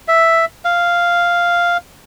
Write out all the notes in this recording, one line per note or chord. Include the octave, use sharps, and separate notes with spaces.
E5
F5